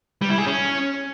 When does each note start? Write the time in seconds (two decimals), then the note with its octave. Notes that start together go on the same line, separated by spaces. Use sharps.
0.22 G3
0.30 E4
0.38 G#4
0.46 C#4